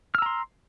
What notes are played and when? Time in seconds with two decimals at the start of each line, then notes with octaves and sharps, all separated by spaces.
0.15 F6
0.18 E6
0.22 A#5
0.26 C6